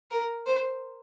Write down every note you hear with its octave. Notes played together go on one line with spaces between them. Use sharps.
A#4
C5